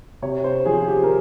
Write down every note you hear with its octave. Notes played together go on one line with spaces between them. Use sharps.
C3 C#5
C5
F3 G#4
G4
A#4